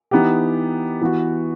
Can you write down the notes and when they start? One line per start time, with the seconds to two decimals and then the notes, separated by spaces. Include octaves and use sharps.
0.11 E3 B3 D#4 G4
1.01 E3 B3 F#4